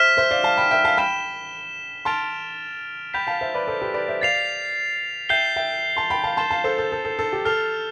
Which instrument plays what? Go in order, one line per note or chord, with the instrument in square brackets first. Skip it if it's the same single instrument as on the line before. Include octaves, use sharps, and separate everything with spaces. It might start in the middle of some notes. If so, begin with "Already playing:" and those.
Already playing: [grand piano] C5 E5 [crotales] F6 B6 E7
[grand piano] C5 E5
D5 F5
F5 A5
G5 B5
E5 G5
F5 A5
[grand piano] G5 B5 [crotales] F6 B6 E7 G7
[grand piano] A5 C6 [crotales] F6 A6 D7 F7
[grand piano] G5 B5 [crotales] G6 B6 F7
[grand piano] F5 A5
C5 E5
B4 D5
A4 C5
G4 B4
B4 D5
C5 E5
[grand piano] D5 F5 [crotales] A6 C7 F7
[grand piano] E5 G5 [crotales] G6 C7 G7
[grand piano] E5 G5
A5 C6
G5 B5
F5 A5
[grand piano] A5 C6 [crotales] A6 E7 G7
[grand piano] F5 A5
A4 C5
A4
A4
A4
A4
G4
[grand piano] A4 [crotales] F6 C7 F7